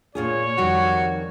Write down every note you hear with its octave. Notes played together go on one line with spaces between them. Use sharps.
A#2 F4 G#4 C#5
F2 D#3 G3 F#4